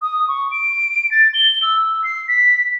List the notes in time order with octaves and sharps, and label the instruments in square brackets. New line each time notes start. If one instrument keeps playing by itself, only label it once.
[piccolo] D#6
C#6
D7
A6
G7
E6
C7
B6